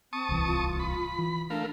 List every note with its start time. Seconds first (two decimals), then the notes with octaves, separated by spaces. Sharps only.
0.13 C4 A5 C#6 D#6
0.29 D1 C2 E3
0.45 F4
0.79 B5
1.18 E3
1.50 A3 D4 A#4 F5